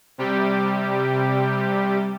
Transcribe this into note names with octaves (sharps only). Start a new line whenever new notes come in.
C3 G3 G4